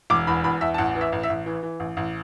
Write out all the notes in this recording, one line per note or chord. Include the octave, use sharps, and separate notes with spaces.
E1 D6
E2 B5
E2 B5
E2 E5
A5
A1 F#5
E3
E5
A1
E5
A1
E3
E3
A1
A1